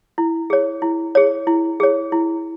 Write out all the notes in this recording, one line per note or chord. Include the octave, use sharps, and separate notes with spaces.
E4
G#4 C#5
E4
G#4 C#5
E4
G#4 C#5
E4